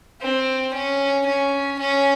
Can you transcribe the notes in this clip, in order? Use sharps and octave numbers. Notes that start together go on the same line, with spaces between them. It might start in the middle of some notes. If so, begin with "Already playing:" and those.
C4
C#4
C#4
C#4